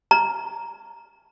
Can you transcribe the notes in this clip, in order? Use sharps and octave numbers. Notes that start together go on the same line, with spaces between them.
A#5